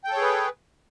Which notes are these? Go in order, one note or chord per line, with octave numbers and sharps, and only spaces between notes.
G#4 A4 B4 C#5 G5